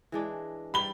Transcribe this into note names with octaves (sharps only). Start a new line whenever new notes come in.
E3 G#3 D4
G3 B5 G7